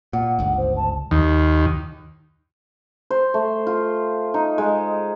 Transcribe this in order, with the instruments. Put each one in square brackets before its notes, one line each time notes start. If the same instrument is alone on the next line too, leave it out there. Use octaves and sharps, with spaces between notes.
[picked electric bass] A#2 [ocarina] F#5
[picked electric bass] G1 C#2
[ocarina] C5
A5
[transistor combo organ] D#2
[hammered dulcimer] C5
A3
F4
D#4
G#3